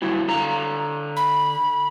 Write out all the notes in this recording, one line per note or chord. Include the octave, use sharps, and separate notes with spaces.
F#3 G3 E4
D3 F5 A#5
B5